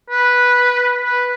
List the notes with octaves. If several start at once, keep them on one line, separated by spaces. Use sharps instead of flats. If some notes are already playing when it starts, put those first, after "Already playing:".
B4
B4